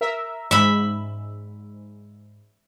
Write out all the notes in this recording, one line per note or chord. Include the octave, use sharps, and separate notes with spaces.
A#4 E5
G#2 E5 B5